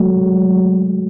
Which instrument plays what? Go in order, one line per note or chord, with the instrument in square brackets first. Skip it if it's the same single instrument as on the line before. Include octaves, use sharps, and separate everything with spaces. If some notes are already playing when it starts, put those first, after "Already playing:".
Already playing: [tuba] F#3 [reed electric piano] G#3 A3